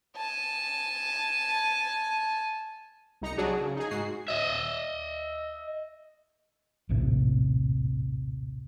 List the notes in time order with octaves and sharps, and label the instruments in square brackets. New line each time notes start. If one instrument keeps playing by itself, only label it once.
[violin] G#5 A5
[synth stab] C2 D#4 A#5 C#7
F#3 D4 F#4 G#4
C#3
D#4 G#4
G#2 F#4 C7
[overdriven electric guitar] D#5 E5
[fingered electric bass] A#1 D#2 A2 C3